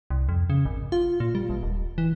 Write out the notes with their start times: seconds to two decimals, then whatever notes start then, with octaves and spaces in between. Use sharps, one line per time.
0.10 C2
0.29 F2
0.50 C#3
0.65 G#1
0.92 F4
1.20 A#2
1.35 G3
1.50 A1
1.63 D#1
1.98 E3